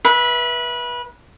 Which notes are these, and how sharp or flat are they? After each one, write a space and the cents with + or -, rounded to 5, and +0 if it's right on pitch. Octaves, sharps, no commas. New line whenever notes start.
B4 -25 E5 +0